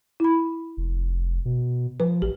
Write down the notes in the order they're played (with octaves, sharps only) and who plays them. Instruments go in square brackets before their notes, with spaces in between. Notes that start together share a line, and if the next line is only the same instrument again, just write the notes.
[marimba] E4 B5
[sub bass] F1
B2
[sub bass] F3 [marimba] B4
[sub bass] A1 [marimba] G4